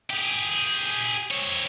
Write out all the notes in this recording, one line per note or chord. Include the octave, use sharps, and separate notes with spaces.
G4 G#4
C4 C#5